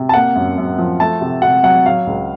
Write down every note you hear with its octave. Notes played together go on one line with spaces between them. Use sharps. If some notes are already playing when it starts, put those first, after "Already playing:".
Already playing: C3
A5
A#3 F#5
F#2
F#2
F3
A3 A5
C3
C3 F#5
F#3 F#5
F#3 F5
C#2